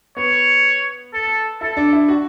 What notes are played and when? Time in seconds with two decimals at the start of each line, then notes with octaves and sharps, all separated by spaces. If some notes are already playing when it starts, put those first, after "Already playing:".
0.17 B3 C#5
1.14 A4
1.61 E4 A4
1.77 D4
1.93 E4
2.08 F#4